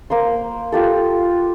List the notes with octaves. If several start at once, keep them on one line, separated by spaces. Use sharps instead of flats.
A#3 C5 C6
F4 G4 A4